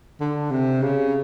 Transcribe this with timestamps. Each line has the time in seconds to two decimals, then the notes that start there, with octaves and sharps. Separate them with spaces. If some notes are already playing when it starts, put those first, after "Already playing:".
0.20 D3
0.51 C3
0.82 C#3